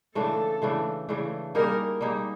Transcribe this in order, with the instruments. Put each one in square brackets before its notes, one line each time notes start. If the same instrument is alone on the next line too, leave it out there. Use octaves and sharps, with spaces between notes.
[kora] C#3 E3 A3 D4 [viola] A4
[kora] C#3 E3 A3 D4
C#3 E3 A3 D4
[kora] G3 A#3 D#4 G#4 [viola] A#4
[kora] G3 A#3 D#4 G#4